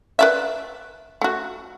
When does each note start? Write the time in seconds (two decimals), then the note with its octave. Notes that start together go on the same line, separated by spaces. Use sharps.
0.19 B4 D5 E5
1.22 A3 F#4